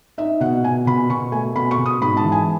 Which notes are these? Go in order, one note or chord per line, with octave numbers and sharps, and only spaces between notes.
D#4 E5
B2 F#5
B2 G#5
B2 B5
B2 C#6
A3 G#5
B2 B5
C#6
B2
D#6
G#2 B5
A5
E3
G#5